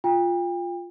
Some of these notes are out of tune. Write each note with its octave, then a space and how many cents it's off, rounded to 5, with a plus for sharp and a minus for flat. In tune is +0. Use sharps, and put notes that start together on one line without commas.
F4 +5 G5 +35